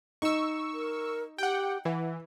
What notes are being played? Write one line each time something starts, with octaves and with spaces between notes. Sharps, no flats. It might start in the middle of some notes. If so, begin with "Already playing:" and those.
D#4 C#6 E6
A#4
G4 F#5 G5
E3 F#5